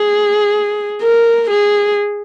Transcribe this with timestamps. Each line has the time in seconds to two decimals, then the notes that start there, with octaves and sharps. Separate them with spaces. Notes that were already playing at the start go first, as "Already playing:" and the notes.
Already playing: G#4
1.02 A#4
1.50 G#4